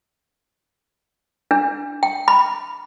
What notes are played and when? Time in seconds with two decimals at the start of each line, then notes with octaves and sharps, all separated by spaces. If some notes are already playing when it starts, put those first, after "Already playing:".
1.51 D4
2.03 G5
2.28 B5